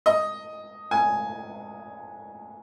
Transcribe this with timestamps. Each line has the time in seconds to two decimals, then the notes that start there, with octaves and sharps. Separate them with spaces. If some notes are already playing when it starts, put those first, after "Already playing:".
0.06 D#5
0.91 G#5